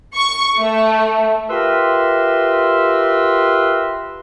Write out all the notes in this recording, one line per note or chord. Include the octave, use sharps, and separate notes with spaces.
C#6
A3
F4 G4 A#4 B4 E5 C6